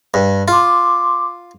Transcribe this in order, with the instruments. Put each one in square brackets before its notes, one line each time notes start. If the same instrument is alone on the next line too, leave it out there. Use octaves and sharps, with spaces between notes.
[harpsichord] G2
[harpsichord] F4 [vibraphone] C6 D6